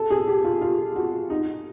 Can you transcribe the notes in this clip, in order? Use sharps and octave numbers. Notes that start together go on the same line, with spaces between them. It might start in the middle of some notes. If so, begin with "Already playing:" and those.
Already playing: A4
G#4
G4
F4
F4
F#4
D#4